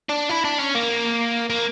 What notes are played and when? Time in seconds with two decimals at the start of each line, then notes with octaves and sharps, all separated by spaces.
0.09 D4
0.29 E4
0.45 D4
0.59 C#4
0.75 A#3
1.50 A#3